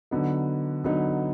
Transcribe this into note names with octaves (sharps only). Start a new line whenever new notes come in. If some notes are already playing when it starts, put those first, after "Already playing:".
D3 F#3 B3 D#4
D3 F#3 B3 D#4